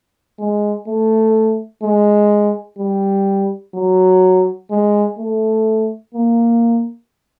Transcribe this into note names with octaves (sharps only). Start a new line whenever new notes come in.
G#3
A3
G#3
G3
F#3
G#3
A3
A#3